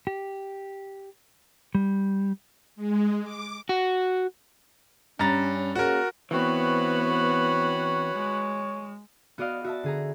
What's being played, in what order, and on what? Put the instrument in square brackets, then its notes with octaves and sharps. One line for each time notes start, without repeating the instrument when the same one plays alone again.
[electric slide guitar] G4
G3
[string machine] G#3
D6
[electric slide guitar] F#4
[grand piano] G2 A#5 A6 [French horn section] C#4
[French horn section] A#3 C#4 G#4 [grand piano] F#4 A#4
[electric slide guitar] E3 C4 [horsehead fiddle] B3 [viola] F#4 B4 [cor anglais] C#5
[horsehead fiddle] G#3
[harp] B3 F#4 D5 D#5 F5
F#4 E5 A5
D3 G#4 A#5